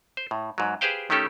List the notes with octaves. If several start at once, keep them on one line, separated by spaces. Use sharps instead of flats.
C5
A2
G#2 F#3
G4 G#4 B4 C5 F5 G5
D#3 A3 C#4 G4 A4